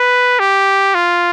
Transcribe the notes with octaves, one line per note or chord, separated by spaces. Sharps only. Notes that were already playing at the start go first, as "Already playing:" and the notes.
Already playing: B4
G4
F4